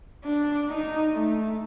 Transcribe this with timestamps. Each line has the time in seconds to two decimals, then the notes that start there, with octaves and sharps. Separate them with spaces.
0.24 D4
0.69 D#4
1.13 A3